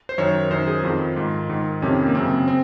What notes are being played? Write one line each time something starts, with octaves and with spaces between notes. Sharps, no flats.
C5
F#2 D#3 C#5
F#2 D#3 C5
G#4
F2 D#3 F4
G#2 D#3
G#2 D#3
F2 C3 D#3 C#4
A#3
F#2 C#3 C4
C4